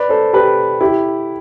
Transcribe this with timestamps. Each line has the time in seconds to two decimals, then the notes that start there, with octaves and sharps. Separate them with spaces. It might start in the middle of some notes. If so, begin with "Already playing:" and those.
Already playing: B4 D5
0.09 A4 C5
0.33 G4 B4
0.81 E4 G4